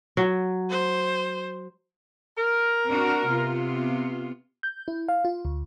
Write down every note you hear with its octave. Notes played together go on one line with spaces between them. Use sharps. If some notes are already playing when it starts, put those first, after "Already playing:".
F#3
C5
A#4
C4 D4 F#4
C3 B3 F4
G6
E4
F5
F4
D2